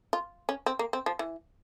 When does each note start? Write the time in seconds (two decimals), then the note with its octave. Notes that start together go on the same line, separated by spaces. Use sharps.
0.13 F4
0.49 C#4
0.66 C4
0.79 A#3
0.93 C4
1.06 F3
1.19 E3